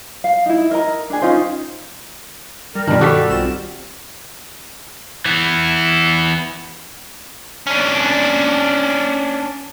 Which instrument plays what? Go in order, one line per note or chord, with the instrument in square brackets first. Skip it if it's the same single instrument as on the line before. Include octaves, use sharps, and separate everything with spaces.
[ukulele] F5
D#4 E4
A#4 D#5 A#5
D4 G#4
C#4 D#4 F4 C5
[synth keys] G3 [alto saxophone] A#4
[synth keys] G2 B2 F3 [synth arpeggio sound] D#3 [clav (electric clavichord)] G3 D4
[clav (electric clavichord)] G3 F#4 [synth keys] G4 [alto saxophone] A4 [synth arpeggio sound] C#6 D6 B6
[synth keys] B1 C4 E7 [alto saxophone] F4
[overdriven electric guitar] E3 B3
C#4 D4